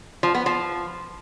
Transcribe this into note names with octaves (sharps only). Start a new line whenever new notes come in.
F3
B3
F3